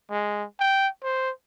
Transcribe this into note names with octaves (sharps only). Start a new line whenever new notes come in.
G#3
G5
C5